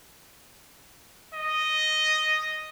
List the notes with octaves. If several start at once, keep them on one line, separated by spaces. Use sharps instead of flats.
D#5